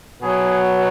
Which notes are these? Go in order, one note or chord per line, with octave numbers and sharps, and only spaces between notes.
B2 F#3 G#4